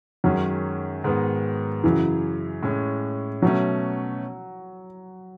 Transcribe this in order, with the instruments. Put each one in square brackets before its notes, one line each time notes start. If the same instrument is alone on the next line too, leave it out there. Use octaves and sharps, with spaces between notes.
[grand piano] F#2 D#3 G#3 C#4 [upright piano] F#3
[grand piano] G#2 D#3 G#3 B3
[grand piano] F#2 C#3 F#3 [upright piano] E3
[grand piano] A2 G#3 C#4
[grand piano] B2 A3 C#4 [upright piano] F#3